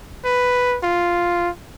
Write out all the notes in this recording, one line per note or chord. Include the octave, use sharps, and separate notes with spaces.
B4
F4